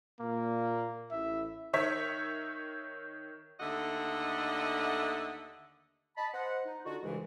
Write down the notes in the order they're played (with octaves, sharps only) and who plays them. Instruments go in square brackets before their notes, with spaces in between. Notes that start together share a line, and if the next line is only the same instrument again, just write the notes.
[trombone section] A#2 [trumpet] A#3
[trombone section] A1 E4 [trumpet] E5
[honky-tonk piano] D#3 C#5 E5 B6
[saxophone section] D#2 D3 A3 D#5 E5 F#5
[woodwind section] D#5 A5 B5
C5 D#5 F#5
D#4
D3 D#4 F4 F#4
C2 G2 C#3 E3 G#3